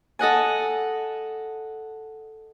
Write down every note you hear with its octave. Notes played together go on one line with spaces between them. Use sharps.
A4 D#5 F#5 G#5